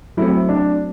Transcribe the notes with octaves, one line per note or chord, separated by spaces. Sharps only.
F#3 A3 C4 E4
D4